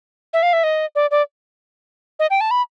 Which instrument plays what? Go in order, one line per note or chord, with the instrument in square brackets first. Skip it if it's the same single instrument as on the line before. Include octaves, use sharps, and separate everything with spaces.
[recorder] E5
F5
E5
D#5
D5
D5
D#5
G5
A5
B5